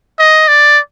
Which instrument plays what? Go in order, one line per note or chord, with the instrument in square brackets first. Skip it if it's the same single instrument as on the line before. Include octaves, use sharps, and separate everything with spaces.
[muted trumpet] D#5
D5